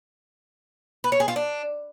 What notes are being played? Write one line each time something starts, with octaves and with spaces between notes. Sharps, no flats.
B4
C#5
G#4
F4
D4